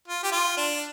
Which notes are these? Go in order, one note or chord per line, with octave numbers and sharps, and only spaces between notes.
F4
G4
F4
D4